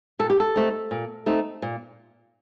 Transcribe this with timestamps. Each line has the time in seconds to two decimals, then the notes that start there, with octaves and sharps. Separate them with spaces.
0.19 A#2 A4
0.30 G4
0.40 A4
0.56 A3 C4 D#4
0.91 A#2
1.26 A3 C4 D#4
1.62 A#2